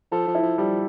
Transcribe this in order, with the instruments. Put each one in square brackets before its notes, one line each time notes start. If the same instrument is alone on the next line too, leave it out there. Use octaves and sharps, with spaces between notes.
[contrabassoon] F3 [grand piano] A4
[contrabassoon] F3
[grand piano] E4
[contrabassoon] F3
[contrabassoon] F3 [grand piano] G3